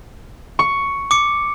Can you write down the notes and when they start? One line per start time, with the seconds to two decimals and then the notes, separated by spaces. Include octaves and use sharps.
0.59 C#6
1.11 D6 C#7